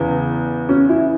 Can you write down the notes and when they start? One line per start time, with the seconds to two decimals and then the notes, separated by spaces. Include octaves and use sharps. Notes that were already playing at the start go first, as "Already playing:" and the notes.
Already playing: E2 C#3
0.69 C#4
0.89 E4